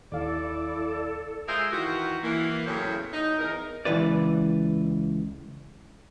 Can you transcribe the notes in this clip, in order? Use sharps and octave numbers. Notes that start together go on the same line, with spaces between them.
D#2 E4 A4 D5 F5
G#3 F4 G#4 A#4 C5 E5
D#3 E3 F4 F#4
E3 A#3
E2 A2 C#3 F#3 C5 C#5
D#4
E2 A#4
C#2 G#2 E3 B4 D5